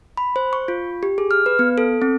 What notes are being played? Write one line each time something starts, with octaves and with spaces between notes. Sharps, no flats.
B5
C5
C#6
F4
G4
G#4
F6
B4
B3
A4
C4